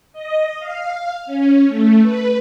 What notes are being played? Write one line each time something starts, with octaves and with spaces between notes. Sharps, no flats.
D#5
F5
C#4
A3
B4